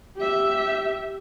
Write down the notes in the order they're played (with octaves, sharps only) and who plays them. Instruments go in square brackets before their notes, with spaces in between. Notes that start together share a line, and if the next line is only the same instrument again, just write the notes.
[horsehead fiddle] G4 E5